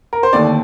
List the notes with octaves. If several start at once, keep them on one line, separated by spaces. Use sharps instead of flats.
A#4
C5
D#2 D3 A3 C4 D5